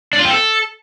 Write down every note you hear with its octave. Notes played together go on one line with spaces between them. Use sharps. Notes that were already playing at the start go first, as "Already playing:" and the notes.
D4
F4
C4
A4